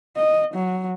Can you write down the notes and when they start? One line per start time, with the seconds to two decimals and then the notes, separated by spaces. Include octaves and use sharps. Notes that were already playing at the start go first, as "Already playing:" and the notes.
0.17 D#5
0.55 F#3